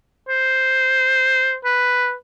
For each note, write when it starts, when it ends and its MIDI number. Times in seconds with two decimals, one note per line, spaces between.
0.29 1.56 72
1.65 2.14 71